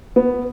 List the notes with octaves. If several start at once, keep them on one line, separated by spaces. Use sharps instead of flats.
B3